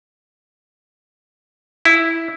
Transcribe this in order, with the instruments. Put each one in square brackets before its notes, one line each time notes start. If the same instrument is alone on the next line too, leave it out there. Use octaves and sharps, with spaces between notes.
[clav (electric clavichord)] E4